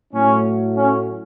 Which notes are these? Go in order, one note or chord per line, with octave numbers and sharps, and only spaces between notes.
A2 F#3 A3 C#4
C#4